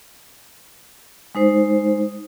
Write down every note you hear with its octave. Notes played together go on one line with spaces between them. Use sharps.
G#3 D#4 C5